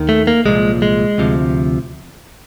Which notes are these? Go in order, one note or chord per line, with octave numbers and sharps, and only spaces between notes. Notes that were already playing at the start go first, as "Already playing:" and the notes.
Already playing: D#2 D#3
A3
A#3
C2 A#2 F3 G#3
G#3
D2 C3 F3